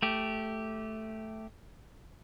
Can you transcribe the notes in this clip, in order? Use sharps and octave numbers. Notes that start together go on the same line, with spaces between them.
A3 G4